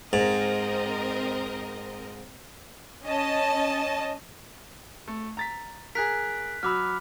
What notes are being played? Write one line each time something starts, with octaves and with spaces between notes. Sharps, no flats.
G#2 C4 A#4 D#5
C#4 D#5 A5
A3
A#5 A6 B6
G#4 A#4 F#6 B6
F#3 B5 D6 E6 F6